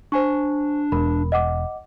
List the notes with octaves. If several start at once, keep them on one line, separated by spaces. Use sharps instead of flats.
D4 C5 G#5 C#6
E1 A#4 B5
D#5 F#5 D6